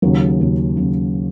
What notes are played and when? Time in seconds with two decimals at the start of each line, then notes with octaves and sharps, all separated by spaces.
0.02 D#2 C#3 F#3
0.40 D#2 C#3 F#3
0.77 C#3 F#3